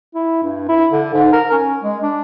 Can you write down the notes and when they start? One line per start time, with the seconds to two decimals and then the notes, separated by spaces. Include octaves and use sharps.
0.14 E4
0.42 G2
0.69 E4
0.91 D3
1.13 G#2
1.33 A#4
1.52 C#4
1.83 G#3
2.02 D4